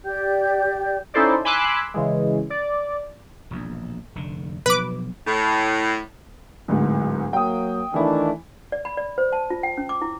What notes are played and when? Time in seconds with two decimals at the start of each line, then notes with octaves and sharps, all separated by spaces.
0.04 G4 D5 G5 G6
1.14 C#4 D#4 E4 A4 C5 D5
1.45 G#5 B5 C6 D6 E6 F#6
1.94 C#3 E3 G#3
2.50 D5
3.51 E1 A#1 E2
4.15 F1 D3
4.66 B2 F3 F#3 B4 D6
5.27 A2
6.68 D1 D2 G#2
7.33 F#3 A#3 G5 D#6
7.94 D#3 E3 A3 D4 E4
8.72 D5
8.85 B5
8.97 D5
9.18 C5
9.32 A5
9.50 F4
9.63 G5
9.78 C#4
9.89 D6
10.02 E4